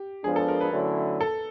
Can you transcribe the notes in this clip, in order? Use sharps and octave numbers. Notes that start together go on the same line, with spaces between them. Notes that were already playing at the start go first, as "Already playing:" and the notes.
Already playing: G4
F3 G#3 B3 D4 G#4
A4
A#4
B4
D3 F#3 A3 C#4 E4
A4